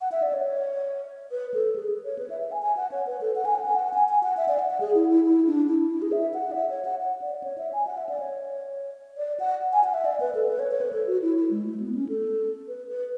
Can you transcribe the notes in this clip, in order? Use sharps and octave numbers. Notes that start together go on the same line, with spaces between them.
F#5
E5
D5
C#5
B4
A4
G#4
C#5
B4
E5
E5
G#5
G#5
F#5
C#5
B4
A4
F#5
G#5
F#5
G#5
F#5
G#5
G#5
F#5
E5
D5
F#5
F#5
G#4
E4
E4
E4
D4
E4
E4
G#4
E5
F#5
D5
E5
C#5
F#5
F#5
D5
C#5
E5
G#5
F#5
E5
D5
C#5
D5
F#5
G#5
F#5
E5
D5
B4
A4
B4
C#5
C#5
B4
A4
F#4
E4
E4
G#3
A3
B3
C#4
A4
B4
B4